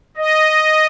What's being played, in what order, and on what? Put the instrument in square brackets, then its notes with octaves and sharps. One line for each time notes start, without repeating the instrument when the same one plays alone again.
[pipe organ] D#5